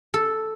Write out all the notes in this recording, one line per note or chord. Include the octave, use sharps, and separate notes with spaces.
A4